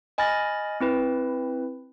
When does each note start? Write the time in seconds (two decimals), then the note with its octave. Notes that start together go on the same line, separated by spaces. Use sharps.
0.18 D#5 G#5 B5 F6 A6 A#6
0.80 C4 E4 B4